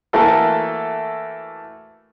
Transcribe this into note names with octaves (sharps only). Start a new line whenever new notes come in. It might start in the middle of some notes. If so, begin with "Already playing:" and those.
E3 A3 A#3 F#4 A4